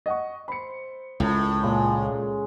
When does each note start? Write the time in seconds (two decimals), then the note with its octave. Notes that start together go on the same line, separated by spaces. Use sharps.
0.06 D#5 F#5 C#6
0.48 C5 B5 C#7
1.20 C#2 A2 A#4
1.63 A#2 C#3 G#3